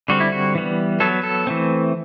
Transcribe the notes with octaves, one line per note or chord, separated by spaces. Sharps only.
D3 G3 C4 F#4
E4
F#4
E3 G3 B3
F#3 B3 A4
A4
E3 A3 C4